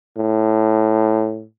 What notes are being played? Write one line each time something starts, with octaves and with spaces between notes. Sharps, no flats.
A2